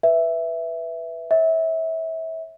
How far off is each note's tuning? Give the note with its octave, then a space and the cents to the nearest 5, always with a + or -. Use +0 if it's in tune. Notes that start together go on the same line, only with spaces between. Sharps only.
B4 +0 E5 +0
C#5 -20 E5 -25